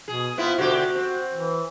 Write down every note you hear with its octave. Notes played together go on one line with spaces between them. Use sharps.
B2 G#4
B3 C4 E4 F4
B2 D3 F#4 G4
C4
E3